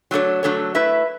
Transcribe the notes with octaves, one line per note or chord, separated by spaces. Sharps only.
F#3 A3 D4 A4 C#5
F#3 A3 D4 A4 C#5
A3 E4 B4 E5